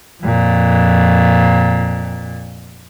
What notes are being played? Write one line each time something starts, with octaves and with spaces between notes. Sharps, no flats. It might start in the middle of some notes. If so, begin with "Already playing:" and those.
F2 A#2